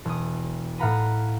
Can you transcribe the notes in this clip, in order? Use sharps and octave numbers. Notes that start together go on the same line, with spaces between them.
E1 D#6
A2 F5 F#5 A#5 B5 D#7